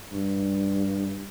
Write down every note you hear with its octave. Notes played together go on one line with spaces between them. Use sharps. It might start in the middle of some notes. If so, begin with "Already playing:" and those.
G2